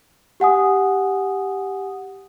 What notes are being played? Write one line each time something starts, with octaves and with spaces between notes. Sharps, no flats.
G4 F#5 G#5 D#6